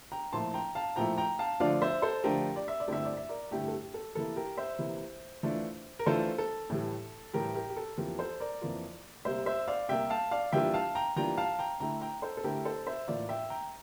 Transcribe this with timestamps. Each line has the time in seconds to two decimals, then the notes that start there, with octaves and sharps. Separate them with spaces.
0.12 G5 A#5
0.33 A#2 F3 A3 E4 A5 C6
0.54 G5 A#5
0.75 F5 A5
0.96 A#2 F3 A3 E4 G5 A#5
1.18 G5 A#5
1.39 F5 A5
1.60 D3 F3 A3 D4 F4 D5 F5
1.82 C5 E5
2.02 A4 C5
2.24 D3 F3 A3 D4 F4 G4 A#4
2.56 D5
2.68 E5
2.80 D5
2.88 G2 D3 A3 C4 E4 E5
3.05 D5
3.17 E5
3.29 A#4 D5
3.51 G2 D3 A3 C4 E4 G4
3.68 A4
3.73 G4
3.94 A4
4.15 C3 E3 A#3 E4 A4
4.36 G4 A#4
4.57 C5 E5
4.79 C3 E3 A#3 E4
5.43 E3 A3 D4 F4
5.99 A#4
6.06 E3 A3 D4 F4 A4 C5
6.38 A4
6.70 A2 E3 G3
7.34 A2 E3 G3 G4 A#4
7.55 G4 A#4
7.70 G4
7.77 A4
7.98 F2 E3 A#3 F4 G4 A#4
8.19 A4 C5
8.40 A#4 D5
8.61 F2 E3 A#3 F4
9.25 C3 G3 A#3 C5 E5
9.46 C5 E5
9.68 D5 F5
9.89 C3 G3 A#3 E5 G5
10.10 F5 A5
10.31 D5 F5
10.52 E3 G3 A#3 D4 F4 E5 G5
10.74 F5 A5
10.95 G5 A#5
11.16 E3 G3 A#3 D4 F4 G5 A#5
11.37 F5 A5
11.59 G5 A#5
11.80 D3 A3 E4 G5 A#5
12.01 G5 A#5
12.22 A4 C5
12.37 A4
12.44 D3 A3 E4 G4 A#4
12.65 A4 C5
12.87 C5 E5
13.08 A2 E3 A#3 F4 D5 F5
13.29 E5 G5
13.50 G5 A#5